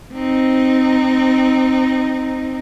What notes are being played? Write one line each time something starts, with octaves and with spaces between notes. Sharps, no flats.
C4 D#4